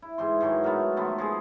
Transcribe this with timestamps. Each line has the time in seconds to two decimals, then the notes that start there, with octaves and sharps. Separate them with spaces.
0.02 E4
0.18 G#2 E3 C6
0.41 G#2 D#3 E3 F#3
0.64 A3 B3 F#4 A#4
0.97 D#3 F3 A3 B3
1.18 F3 G#3 G#4